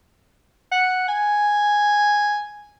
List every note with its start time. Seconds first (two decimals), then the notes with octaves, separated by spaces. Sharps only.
0.72 F#5
1.08 G#5